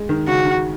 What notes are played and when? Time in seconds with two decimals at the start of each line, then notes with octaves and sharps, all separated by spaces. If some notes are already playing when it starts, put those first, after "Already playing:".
Already playing: G#3
0.09 D#3
0.27 C#3 F#4
0.45 D#3